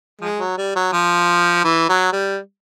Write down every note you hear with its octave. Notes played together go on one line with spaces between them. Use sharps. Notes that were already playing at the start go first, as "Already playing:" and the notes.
F3 G#3
F#3
G3
F#3
F3
E3
F#3
G3